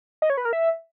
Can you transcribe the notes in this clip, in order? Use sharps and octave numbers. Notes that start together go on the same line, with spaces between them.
D#5
C#5
B4
A#4
E5